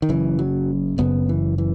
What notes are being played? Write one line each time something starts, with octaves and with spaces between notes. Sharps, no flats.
D#3
F#1 F#2 C#3 E3
F#3
F#1 F#2 C#3 B3
E3
E3